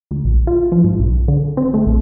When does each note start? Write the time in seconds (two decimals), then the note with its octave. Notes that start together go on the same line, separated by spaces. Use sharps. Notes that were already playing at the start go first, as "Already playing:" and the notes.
0.11 D2
0.25 A#1
0.47 F4
0.72 F3
0.84 G#2
0.99 B1
1.28 D3
1.57 C4
1.74 A3
1.86 A#1